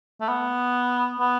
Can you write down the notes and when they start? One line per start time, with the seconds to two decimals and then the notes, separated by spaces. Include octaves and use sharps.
0.21 A3
0.28 B3
1.19 B3